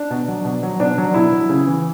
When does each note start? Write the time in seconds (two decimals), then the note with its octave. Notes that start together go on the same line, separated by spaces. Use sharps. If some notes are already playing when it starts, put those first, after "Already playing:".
Already playing: D4
0.10 B2
0.28 F#3
0.45 B2
0.63 F#3
0.80 B2 D4
0.98 F#3
1.14 B2 E4
1.32 F#3
1.49 C#3
1.67 E3